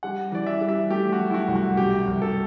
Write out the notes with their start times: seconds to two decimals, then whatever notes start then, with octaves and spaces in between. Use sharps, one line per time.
0.03 G3 F#5
0.32 E3 D5
0.47 E5
0.61 G3
0.69 E5
0.90 A3 G4
1.13 F#4
1.19 F#3
1.30 E4
1.34 F#4
1.48 C2
1.56 F#4
1.77 B2 G4
2.07 C2
2.22 A4